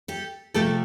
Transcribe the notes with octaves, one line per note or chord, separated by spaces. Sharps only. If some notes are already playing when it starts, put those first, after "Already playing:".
G4 A4
C3 F3 A3 G4 A4